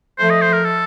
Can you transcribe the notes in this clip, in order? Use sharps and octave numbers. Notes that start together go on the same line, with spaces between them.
F3 A3 C5
D#5
C5
A#4
A4